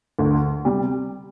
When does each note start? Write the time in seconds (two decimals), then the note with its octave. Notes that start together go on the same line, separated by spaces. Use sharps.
0.19 D2
0.65 C3 G3